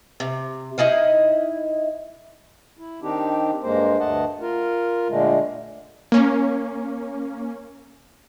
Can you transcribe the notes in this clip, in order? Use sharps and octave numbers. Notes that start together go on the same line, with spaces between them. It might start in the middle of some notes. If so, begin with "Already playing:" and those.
C3
D#4 E4 D#5 F5
E4
D#3 C4 D4 D#4 G4
G2 G#3 A#3 C5
D2 G2 A3 D#5 F#5 A5
F4 A#4
A#2 D3 G#3 A3
A#3 C#4